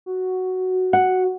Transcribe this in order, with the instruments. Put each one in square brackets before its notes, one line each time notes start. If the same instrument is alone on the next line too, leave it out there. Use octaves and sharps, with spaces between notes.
[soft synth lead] F#4
[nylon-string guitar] F#5